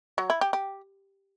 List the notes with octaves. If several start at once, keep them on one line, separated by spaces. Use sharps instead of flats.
F#3
E4
G4
G4